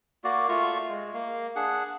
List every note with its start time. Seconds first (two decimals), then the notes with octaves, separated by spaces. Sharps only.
0.24 A#3 F#4 D5
0.49 A3 F4 C#6
0.89 G#3
1.14 A#3
1.56 D4 G#4 F#5